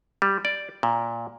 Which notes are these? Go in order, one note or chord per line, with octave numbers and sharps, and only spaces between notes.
G3
D5
A#2